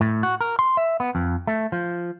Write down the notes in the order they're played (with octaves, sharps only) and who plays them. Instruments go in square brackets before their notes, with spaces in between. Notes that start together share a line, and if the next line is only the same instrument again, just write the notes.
[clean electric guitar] A2
F#4
A#4
C6
E5
B3
F2
A3
F3